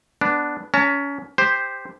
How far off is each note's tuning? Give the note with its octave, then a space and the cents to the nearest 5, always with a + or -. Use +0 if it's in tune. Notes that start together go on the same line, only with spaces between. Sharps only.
B3 +0 D4 +0
C#4 +25 A#5 -35
G4 +10 C5 +0